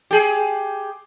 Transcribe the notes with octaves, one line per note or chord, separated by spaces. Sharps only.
G4 G#4